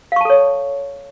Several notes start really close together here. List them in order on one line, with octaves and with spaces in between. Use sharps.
F5 C#6 A5 A4 C#5